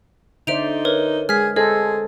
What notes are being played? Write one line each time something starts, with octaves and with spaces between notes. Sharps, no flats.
D3 D#4 C5 D5 E5 D7 F7
A#4 B4 C#5
G#3 G#4 F6 B6
G#4 A4 C5 D#5